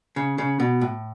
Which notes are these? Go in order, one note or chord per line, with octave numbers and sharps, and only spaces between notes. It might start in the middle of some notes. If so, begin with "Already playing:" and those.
C#3
C#3
B2
A2